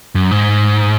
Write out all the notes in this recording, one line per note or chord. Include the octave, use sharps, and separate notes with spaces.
F#2
G#2